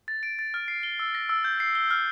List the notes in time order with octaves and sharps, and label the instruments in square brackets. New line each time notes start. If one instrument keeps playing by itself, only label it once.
[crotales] A6
D7
A6
F6
C7
G7
E6
A#6
E6
G6
C7
G7
F6